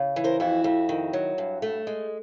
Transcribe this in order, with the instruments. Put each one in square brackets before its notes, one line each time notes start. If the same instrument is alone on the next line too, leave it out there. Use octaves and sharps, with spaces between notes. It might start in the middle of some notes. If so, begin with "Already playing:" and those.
Already playing: [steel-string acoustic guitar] C#3
E3
A#4 C5
F2 E4 F#4
F2
D#3
F#3
G2
A3
G#3